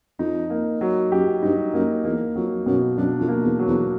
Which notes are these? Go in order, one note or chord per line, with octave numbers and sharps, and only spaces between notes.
F2 D#4
A#3
F#3
F#2 G4
G2 D#4
F#2 A#3
E2 A#3
F2 F#3
F#2 B2
F#2 D4
F2
A#3
E2
F#3
E2